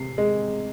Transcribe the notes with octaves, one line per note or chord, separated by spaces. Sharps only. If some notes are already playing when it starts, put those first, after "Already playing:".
Already playing: C3 C7
G#3